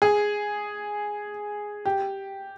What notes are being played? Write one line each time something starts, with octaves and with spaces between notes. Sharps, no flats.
G#4
G4